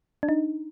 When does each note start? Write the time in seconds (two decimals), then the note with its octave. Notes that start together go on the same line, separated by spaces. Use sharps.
0.23 D4
0.29 D#4